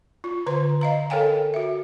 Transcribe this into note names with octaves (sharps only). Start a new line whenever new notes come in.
F4
D3 B4 C5 C6
D#5 F5 A#5
A4 A#4 C#5 F5 G5 G#5
F#4 E5